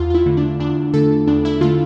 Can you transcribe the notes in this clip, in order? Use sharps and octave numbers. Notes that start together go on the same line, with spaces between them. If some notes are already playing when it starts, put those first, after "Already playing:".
Already playing: E2 F4
F4
E4
D3 A3
D4
E2 D4
D3 A3 A4
E2 D4
E4
D3 A3 F4